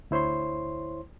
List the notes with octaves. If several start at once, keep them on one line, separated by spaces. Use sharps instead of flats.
D2 E4 C5 C#5 C6